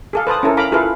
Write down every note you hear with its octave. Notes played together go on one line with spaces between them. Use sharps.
G#4 A4 F5
B4 C5 A5 D#6
C#4 E4 A4 A#4
F5 A#5 B5 D6
E4 F4 G#4 A4 B4 F5